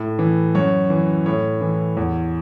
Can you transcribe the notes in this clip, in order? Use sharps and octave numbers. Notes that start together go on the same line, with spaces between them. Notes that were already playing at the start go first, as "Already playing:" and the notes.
Already playing: A2
E3
F#2 C#5
E3
A2 C#5
E3
E2